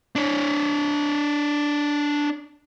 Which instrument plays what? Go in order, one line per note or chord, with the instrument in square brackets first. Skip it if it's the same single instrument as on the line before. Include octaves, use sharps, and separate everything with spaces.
[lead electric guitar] D4 C#5